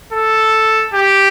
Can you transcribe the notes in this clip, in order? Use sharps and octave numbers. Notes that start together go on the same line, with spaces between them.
A4
G4